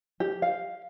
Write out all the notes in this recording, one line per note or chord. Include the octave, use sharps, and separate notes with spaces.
G4
F5